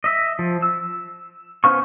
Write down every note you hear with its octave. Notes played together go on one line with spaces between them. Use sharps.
D#5 E5
F3
E6
B3 C#4 C5 F5 C#6